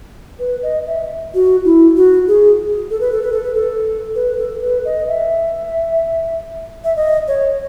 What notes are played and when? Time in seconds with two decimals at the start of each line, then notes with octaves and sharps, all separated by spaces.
0.39 B4
0.63 D#5
0.87 E5
1.34 F#4
1.65 E4
1.97 F#4
2.28 G#4
2.91 A4
3.00 B4
3.12 A4
3.22 B4
3.32 A4
3.43 B4
3.55 A4
4.15 B4
4.38 A4
4.62 B4
4.85 D#5
5.08 E5
6.84 E5
6.96 D#5
7.28 C#5